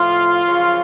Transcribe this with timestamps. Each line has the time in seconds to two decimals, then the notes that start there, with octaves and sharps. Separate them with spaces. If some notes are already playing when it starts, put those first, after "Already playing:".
Already playing: A2 F3 F4
0.44 F#2 C#3 F3